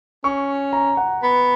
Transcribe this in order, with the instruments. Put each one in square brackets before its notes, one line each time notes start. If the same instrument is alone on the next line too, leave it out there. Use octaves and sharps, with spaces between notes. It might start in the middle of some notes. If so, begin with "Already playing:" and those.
[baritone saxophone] C#4 [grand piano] C#6
[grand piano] A#5
F#5
[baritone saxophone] B3